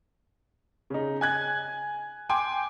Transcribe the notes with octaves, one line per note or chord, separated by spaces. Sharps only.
C#3 D#4
G#5 F#6 G#6
G5 G#5 C6 D6